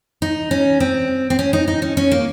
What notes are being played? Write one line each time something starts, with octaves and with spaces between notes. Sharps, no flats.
D#4
C#4
C4
C4
C#4
D#4
D#4
C#4
C#4
A#3